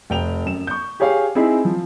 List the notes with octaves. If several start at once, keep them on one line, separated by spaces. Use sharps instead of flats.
F1 G5 F7
F#2 E7
C#6 G6
G4 G#4 C#5 F5 G5
C4 D#4 E4 G#4
F3